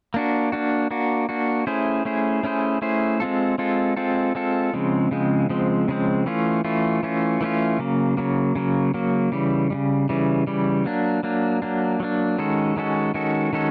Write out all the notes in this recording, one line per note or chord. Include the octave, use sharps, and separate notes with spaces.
A#3 D4 F#4
A#3 D4 F#4
A#3 D4 F#4
A#3 D4 F#4
A3 C#4 E4 G#4 C5
A3 C#4 E4 G#4 C5
A3 C#4 E4 G#4 C5
A3 C#4 E4 G#4 C5
G#3 C4 F4 A4
G#3 C4 F4 A4
G#3 C4 F4 A4
G#3 C4 F4 A4
C#3 F3 G#3 C4
C#3 F3 G#3 C4
C#3 F3 G#3 C4
C#3 F3 G#3 C4
E3 A3 C#4 F4
E3 A3 C#4 F4
E3 A3 C#4 F4
E3 A3 C#4 F4
C#3 F#3 A#3
C#3 F#3 A#3
C#3 F#3 A#3
C#3 F#3 A#3
C#3 E3 G3
C#3 E3 G3
C#3 E3 G3
C#3 E3 G3
F#3 A#3 D4
F#3 A#3 D4
F#3 A#3 D4
F#3 A#3 D4
D#3 G#3 C#4 F#4 A4
D#3 G#3 C#4 F#4 A4
D#3 G#3 C#4 F#4 A4
D#3 G#3 C#4 F#4 A4